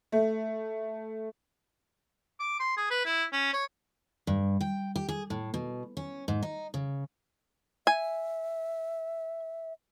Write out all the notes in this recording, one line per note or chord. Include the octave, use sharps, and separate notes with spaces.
A3
D6
C6
G#4
B4
E4
C#4
C#5
G2
G5
G4
G#4
A2
B2
C#4
G#2
D#4
C#3
E5 G#5